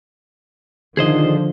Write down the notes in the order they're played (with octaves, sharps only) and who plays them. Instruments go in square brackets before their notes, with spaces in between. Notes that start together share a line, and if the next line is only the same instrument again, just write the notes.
[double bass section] D3 F3 [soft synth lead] D#3 [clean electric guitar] G#4 C5 D#5